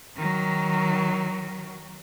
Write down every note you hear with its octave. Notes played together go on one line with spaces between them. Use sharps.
D#3 F#3